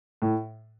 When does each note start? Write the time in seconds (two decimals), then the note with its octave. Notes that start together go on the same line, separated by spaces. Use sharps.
0.22 A2